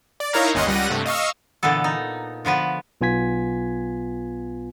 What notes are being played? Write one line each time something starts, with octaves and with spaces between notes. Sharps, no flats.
D5
D#4 E4 A#4 C#5 F5 A#5
G1 D#2 C#4 D#5 F#5 C6
C#2 G3 F#5 A#6 D#7
G2 C3 A3
D#5 F5 C#6 E6
A#2 D3 E3 B3 A4
D#4
D3 F3 B3 B4
B1 B3 F4 G#5 G#6 B6